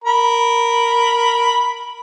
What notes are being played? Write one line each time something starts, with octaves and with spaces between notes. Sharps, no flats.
A#4 B5